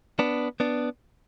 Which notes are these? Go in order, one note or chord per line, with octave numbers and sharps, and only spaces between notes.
B3 D4
B3 D4